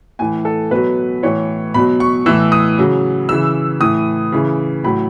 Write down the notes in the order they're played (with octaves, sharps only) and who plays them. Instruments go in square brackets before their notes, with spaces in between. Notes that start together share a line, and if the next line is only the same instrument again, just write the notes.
[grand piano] A2 E3 G#5
A4
B2 F#3 B4
A2 E3 C#5
B2 F#3 B5
C#6
A2 E3 E6
D#6
C#3 F#3
C#3 E3 E6
A2 E3 D#6
C#3 E3
A2 F#3 B5